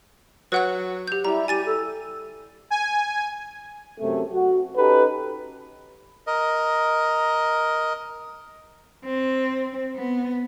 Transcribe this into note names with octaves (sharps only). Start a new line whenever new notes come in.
F#3 B4 F#5 F#6
G4 G6
G3 E4 A#5
G4 G#5 A6 D#7
A4
G#5
F#2 C3 A3
F#4
C#4 D#4 G4 A4 B4
A#4 D#5
C4
B3